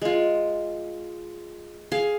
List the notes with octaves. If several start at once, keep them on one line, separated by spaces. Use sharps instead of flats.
G#3 F4
G#4 F5